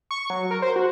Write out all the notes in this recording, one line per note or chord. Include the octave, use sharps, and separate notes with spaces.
C#6
F#3
A#4
C5
F#4